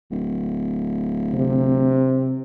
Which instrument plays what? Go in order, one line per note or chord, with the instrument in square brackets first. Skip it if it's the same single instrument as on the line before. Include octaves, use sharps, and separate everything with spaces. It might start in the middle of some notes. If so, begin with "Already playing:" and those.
[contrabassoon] D1
[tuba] C3